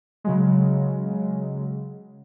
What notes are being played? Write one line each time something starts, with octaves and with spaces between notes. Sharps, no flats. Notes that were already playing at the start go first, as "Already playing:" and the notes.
C#3 F#3 G#3